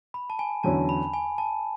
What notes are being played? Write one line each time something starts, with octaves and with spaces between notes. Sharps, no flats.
B5
A5
G#5
E2 D3 F#3 C#4 E4 A5
B5
G#5
A5